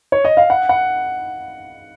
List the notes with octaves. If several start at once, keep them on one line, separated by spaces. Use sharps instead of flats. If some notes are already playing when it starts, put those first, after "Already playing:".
C#5
D#5
F5
F#5
F#5